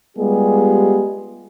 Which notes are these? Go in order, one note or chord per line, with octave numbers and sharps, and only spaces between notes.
G3 G#3 B3 F4 G4 G#4